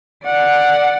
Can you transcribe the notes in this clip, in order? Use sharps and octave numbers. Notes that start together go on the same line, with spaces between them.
D5 F#5